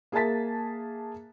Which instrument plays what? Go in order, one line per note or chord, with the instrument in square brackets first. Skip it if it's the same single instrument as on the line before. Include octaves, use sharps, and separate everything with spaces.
[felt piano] A#3 G#4 E5 A5 A6 B6